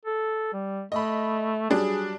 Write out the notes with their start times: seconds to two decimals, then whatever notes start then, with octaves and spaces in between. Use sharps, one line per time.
0.05 A4
0.53 G3
0.92 A3 D#5 B5
1.70 F#3 G3 D4 G#4